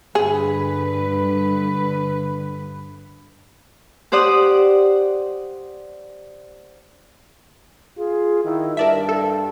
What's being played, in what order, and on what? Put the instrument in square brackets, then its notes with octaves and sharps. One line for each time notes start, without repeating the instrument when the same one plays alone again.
[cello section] G2 D3 B4 [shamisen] G#4
[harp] G4 C5 D5 F#5 D#6
[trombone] F4 [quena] G#4
[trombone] D#3 [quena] E4
[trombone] G2 [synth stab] A#4 D5 E5 [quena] A5
[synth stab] A4